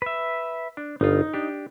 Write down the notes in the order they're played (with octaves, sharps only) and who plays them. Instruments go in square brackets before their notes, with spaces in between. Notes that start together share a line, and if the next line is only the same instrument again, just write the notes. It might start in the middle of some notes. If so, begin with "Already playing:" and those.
[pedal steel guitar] B4 E5
[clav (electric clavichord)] D4
[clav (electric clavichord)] G1 F4 [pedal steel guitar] D#4
[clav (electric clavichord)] D4 G4